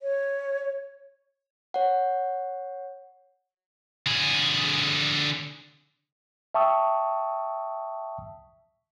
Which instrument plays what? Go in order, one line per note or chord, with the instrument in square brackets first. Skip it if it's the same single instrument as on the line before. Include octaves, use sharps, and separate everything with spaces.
[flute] C#5
[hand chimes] C#5 F#5
[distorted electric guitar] D3 G#4
[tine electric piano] E5 G5 A5 C#6 D#6 E6